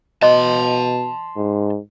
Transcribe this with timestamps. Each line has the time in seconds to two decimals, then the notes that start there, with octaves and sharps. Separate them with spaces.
0.22 B2 D#5 A5 C6
1.36 G#2